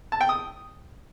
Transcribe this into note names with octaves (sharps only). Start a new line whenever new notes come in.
A5
G5
D#6